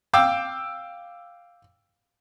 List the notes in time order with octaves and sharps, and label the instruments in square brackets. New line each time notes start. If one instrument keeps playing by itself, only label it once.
[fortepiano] F5 G5 D6 E6